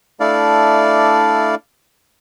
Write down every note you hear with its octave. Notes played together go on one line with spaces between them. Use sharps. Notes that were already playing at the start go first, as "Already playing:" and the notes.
A3 D4 E4 D5 F5